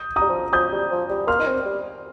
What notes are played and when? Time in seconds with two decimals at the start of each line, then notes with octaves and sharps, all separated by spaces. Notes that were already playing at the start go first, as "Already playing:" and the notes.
Already playing: D#6 G6
0.16 G3 A#5 D#6
0.29 F3
0.53 F3 D#6 G6
0.72 G3
0.91 F3
1.10 G3
1.27 A#3 C6 F6
1.40 D#4
1.46 C4
1.66 G3